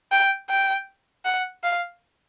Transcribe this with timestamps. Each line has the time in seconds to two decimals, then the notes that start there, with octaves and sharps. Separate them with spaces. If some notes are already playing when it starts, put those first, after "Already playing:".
0.12 G5
0.50 G5
1.25 F#5
1.64 F5